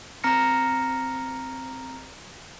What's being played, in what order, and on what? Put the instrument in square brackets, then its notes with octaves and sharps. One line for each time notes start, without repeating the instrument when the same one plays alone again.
[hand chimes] C4 A#5 F6 A#6 C#7